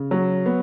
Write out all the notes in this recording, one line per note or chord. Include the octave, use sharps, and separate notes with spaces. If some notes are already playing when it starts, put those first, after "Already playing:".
Already playing: C#3
F#3
B3